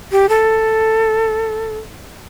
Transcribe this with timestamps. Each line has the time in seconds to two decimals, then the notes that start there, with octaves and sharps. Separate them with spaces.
0.12 G4
0.29 A4